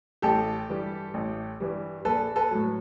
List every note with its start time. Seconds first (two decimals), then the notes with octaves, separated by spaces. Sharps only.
0.22 A1 G4 A4
0.69 G2 E3 G3
1.14 A1
1.60 G2 E3 G3
2.05 A#1 A4 B4
2.36 A4 B4
2.51 A2 F#3